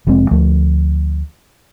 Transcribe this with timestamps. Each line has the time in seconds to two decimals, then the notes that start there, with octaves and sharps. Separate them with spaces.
0.07 F1 F2 G#3 C4
0.31 D2 F3 A3